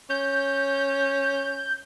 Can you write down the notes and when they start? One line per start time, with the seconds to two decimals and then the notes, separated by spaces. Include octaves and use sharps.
0.10 C#4 G6